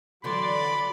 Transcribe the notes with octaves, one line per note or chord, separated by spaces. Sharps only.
D3 E3 F#3 F#4 D5 B5 C6